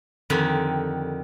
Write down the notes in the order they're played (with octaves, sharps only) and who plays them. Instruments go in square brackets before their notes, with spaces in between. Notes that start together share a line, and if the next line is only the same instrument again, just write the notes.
[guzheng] F2 D3 D#3 G4 G#5